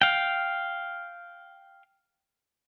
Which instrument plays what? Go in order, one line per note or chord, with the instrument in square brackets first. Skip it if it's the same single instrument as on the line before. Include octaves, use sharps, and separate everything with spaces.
[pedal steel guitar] F5 G5